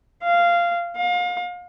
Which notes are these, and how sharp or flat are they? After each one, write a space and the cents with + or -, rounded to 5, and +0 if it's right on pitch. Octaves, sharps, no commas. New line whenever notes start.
F5 -15
F5 +35